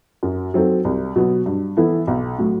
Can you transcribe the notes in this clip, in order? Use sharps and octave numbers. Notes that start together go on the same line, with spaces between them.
F#2
F#3 C4 D#4 A4
C2
B2 F#3 B3
G2
E3 B3 E4 A4
B1
A2 F#3